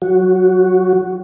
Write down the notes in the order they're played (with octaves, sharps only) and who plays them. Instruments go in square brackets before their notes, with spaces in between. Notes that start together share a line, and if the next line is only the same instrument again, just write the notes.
[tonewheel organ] F#3 F#4